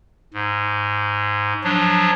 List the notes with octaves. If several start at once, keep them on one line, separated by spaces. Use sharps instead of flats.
G#2
F3 F#3 D4